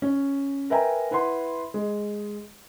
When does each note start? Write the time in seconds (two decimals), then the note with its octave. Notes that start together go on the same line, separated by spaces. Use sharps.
0.02 C#4
0.70 A#4 B4 E5 G5 G#5 A#5
1.11 E4 B4 F#5 C6
1.74 G#3